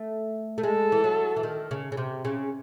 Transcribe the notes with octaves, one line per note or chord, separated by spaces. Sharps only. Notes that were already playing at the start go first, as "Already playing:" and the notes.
Already playing: A3
A3
G#3 A4
E3
F#3
E3
D#3
C#3
C#3
C3
C#3